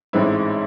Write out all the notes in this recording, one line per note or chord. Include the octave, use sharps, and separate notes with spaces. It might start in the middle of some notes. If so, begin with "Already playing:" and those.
A1 G#2 G#3 C4 E4